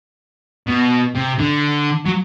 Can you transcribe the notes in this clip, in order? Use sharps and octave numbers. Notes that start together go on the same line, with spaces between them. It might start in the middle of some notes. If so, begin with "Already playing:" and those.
B2
C3
D3
F#3